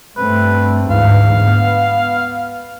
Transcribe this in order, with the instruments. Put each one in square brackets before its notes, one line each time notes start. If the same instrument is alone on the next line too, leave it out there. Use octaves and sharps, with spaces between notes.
[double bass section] G2 A3 C4 [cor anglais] B4
[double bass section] D2 G#2 E3 [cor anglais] F5
[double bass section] B3